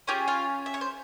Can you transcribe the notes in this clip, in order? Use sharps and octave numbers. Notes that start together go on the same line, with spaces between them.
C#4 F4 G4 G#4 G5
F4 F5
E5
C#5
C5